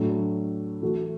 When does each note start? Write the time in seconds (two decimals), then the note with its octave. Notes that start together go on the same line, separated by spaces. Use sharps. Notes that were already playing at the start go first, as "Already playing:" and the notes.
Already playing: A2 F#3 D4 A4
0.81 E3 A3 F#4 A4